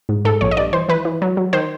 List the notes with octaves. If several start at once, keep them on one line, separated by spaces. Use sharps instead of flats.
G#2
G#2 A4
A#1 C#5
D#5
G2 D5
E3 C5
E3 B4
E3
F#3
F#3
D#3 C5